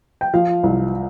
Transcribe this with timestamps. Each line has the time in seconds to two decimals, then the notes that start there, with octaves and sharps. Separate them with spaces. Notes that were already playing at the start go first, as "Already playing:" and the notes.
0.21 G5
0.34 F3 F5
0.64 C2